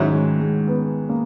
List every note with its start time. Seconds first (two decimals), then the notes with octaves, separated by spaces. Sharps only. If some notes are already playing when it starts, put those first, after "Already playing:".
Already playing: G#2 D#3 F#3 C#4 E4
0.13 G#3
0.40 G#3
0.67 B3
1.09 A#3